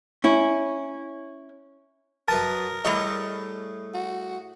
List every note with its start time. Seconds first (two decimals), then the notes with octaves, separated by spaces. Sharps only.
0.24 C#4 E4
2.28 F#2 A#4 B4 A5 D#6
2.85 A2 G3 A3 G#4 D#5 C#6
3.94 F#4